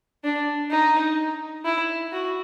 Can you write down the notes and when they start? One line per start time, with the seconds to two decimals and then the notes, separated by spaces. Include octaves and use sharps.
0.24 D4
0.71 D#4
1.65 E4
2.12 F#4